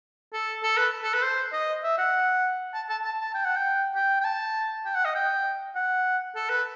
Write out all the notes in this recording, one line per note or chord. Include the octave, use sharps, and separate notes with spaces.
A4
A4
B4
A4
B4
C5
D#5
E5
F#5
A5
A5
A5
A5
G5
F#5
G5
G5
G5
A5
G5
F#5
D#5
G5
F#5
A4
B4